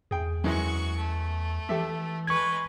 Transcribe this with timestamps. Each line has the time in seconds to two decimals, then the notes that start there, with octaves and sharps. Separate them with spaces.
0.11 E2 G#4 G5
0.44 F#2 E3 G#3 F#4 C#6
0.97 A3
1.69 E3 G4 A4 E5
2.27 G#3 B4 C#6 G#6